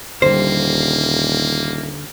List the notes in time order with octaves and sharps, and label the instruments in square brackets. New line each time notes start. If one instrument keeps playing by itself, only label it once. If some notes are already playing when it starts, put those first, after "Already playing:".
[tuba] D#1 [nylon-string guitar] D3 G3 [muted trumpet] A#3 [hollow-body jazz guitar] C5